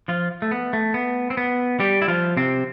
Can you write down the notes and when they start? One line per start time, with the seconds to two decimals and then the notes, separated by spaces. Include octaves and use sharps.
0.08 F3 F4
0.42 A3
0.51 B3
0.73 A3
0.94 B3
1.30 C4
1.37 B3
1.80 G3 G4
2.02 E4
2.08 F3 F4
2.37 C3 C4